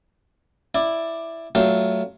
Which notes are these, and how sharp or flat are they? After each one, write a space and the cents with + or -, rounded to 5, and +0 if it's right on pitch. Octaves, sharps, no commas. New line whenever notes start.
E4 +0 D5 +10
F#3 +25 A3 +10 F4 +15